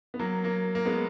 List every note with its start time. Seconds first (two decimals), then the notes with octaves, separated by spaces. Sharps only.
0.14 B3
0.19 F#3 A#3
0.44 F#3 A#3
0.75 A#3
0.85 G#3 B3